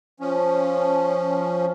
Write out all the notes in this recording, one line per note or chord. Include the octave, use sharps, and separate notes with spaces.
F3 C#4